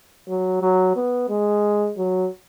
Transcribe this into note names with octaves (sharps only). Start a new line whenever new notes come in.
F#3
F#3
B3
G#3
F#3